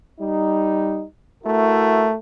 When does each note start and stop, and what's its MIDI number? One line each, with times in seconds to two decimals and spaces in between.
0.20 1.04 55
0.20 1.04 63
1.44 2.12 57
1.44 2.12 64
1.44 2.12 66
1.44 2.12 70